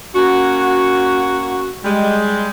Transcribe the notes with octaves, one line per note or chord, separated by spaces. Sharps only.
A#3 C#4 F#4
G3 G#3